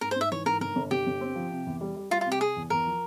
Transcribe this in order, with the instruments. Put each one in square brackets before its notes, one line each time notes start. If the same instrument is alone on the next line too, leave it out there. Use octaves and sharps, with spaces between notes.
[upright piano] G#2 [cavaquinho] A#4
[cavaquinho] C5
[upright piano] G#2 [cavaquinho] E5
[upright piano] E3 [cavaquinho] C#5
[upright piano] G#2 [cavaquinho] A#4
[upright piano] G1 [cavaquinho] A#4
[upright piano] G1
[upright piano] G1 [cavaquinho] G4
[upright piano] G1
C4
F3
C3
E2
G3
G3
[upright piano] G3 [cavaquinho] F4
[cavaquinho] F4
[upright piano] C3
[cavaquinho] G4
[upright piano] C3 [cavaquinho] G#4
[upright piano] E2
[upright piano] E2 [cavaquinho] A#4
[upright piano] F3